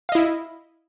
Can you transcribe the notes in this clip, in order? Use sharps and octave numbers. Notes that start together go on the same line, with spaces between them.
E4 D#5 F5